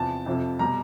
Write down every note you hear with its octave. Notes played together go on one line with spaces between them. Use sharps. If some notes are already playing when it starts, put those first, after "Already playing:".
Already playing: E2 C3 F3 A5
F2 C3 F3
B2 G3 A#5